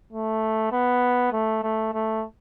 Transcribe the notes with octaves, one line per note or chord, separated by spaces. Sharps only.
A3
B3
A3
A3
A3